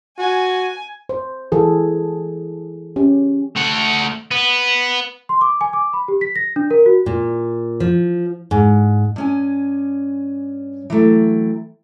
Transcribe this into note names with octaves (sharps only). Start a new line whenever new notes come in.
F#4 G#5
C5
E3 G#4 A4
C#4 G4
A3 F#5
B3
C6
D6
G#5
D6
B5
G4
B6
A#6
D4
A#4
F#4
A#2
F3
G#2
G2 C#4 G#5
E3 F#3 A3 G5